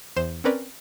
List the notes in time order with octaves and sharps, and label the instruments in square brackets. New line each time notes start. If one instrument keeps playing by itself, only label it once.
[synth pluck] E2 C5 E7
C4 C#4 A#4 B4 D5